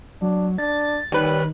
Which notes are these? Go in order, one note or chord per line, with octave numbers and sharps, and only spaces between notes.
F#3 D4
D4 A6
D#2 D#3 G3 B4